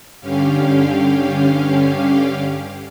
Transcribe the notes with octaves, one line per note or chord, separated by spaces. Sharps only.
G2 D3 C#4 G4 F5